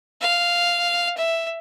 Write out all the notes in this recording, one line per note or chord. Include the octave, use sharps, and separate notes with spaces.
F5
E5